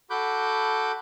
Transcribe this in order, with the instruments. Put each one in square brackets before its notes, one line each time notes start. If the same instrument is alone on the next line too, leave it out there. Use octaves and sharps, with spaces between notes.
[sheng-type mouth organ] F#4 A4 B5 D6 F#6 G6